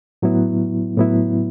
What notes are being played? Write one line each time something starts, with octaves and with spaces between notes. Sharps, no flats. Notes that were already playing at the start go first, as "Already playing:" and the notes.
A2 F#3 B3 E4
A2 F#3 B3 E4